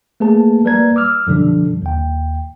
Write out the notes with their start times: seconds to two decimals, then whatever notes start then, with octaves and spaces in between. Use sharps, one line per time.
0.20 A3 A#3 G#4 B4 A5
0.65 G3 A#3 B4 D5 A#5 G#6
0.96 D6 E6 F6
1.27 F#2 B2 D3 F3 G3 D4
1.82 D#2 G5